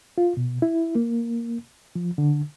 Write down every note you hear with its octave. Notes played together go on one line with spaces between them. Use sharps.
F4
B2
E4
A#3
F3
D3